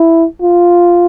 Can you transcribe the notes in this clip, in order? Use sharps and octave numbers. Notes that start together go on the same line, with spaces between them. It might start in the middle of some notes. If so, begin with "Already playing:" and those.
Already playing: E4
F4